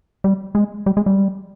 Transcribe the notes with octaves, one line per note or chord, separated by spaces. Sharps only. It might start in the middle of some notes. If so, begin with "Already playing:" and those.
G3
G#3
G3
G#3
G3